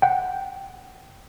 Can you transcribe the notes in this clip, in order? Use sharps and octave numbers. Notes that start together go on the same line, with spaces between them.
F#5 G5